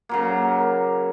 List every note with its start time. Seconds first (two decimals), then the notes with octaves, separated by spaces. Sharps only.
0.09 C#3 F#3 A#3